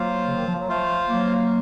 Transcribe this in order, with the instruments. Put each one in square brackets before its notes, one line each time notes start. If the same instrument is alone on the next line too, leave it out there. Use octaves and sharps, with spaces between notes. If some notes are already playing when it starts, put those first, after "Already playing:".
Already playing: [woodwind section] F#3 A#3 [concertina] F4 C5 F5
[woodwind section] C#3
D#3
F3
F#3
[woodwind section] F3 A3 [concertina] F4 C5 F5
[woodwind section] F#3 A#3